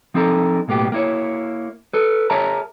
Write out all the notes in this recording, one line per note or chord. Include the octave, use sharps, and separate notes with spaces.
F3 C4 D#4 A4 A#4
B1 A2 A#3 B3 G4
A#3 E4 C#5
A4 B4
G#4 A#4 C#5 E5 A5 A#5